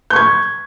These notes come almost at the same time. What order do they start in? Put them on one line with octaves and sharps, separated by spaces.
G6 C#6 G#6